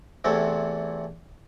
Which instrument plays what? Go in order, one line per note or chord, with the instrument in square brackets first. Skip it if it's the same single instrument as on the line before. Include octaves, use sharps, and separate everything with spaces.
[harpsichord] E2 C3 E3 A3 C4